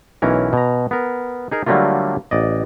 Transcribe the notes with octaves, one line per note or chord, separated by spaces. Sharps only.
B1 E3 C#4 A#4
B2 A#5
B3 A#4
D#4 G#4 A#4
D3 F#3 G3 A3 A#3 F4
A1 D5 D#5